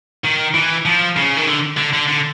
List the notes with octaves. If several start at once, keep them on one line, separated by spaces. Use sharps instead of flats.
D#3
E3
F3
C#3
D#3
D3
D3
D3
D3